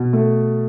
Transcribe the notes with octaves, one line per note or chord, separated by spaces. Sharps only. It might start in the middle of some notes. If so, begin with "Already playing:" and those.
Already playing: B2
A3